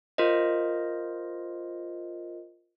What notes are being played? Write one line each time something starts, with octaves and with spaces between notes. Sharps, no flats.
F4 A#4 C5 D#5